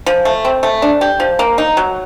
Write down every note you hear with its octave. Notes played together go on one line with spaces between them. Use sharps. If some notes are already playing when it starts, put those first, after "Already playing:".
F3
A3
C4
A3
D4
G4
F3
A#3
D#4
F#3